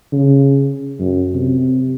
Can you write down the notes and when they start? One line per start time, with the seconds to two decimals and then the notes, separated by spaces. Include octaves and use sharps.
0.13 C#3
0.99 F#2
1.35 C3